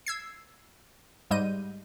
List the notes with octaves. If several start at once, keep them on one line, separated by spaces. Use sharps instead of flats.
E6 G#6 C7
G#2 G3 G#3 D#5 G6 D#7